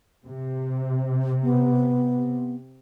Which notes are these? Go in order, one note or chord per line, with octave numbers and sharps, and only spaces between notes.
C3
B3